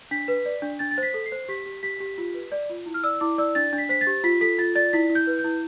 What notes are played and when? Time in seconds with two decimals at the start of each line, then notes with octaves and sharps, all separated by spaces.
0.11 D4 B6
0.28 B4
0.45 D5
0.62 D4
0.79 D4 A6
0.91 A6
0.98 C5 B6
1.14 A4
1.26 C7
1.32 C5
1.49 G4 B6
1.66 G4
1.83 G4 B6
2.00 G4
2.18 F4
2.34 B4
2.52 D5
2.69 F4
2.86 E4
2.94 F6
3.03 D5 E6
3.21 E4 D6
3.38 D5 E6
3.55 D4 A6
3.73 D4
3.78 B6
3.89 C5 B6
4.01 A6
4.07 G4
4.24 F4 B6
4.41 A4 B6
4.58 F4 A6
4.75 D5 A6
4.93 E4 B6
5.10 E4
5.15 G6
5.27 B4
5.39 G6
5.44 E4